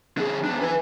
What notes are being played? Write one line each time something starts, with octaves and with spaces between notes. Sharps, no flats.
D3 G#4
E2 D4
B4 G#5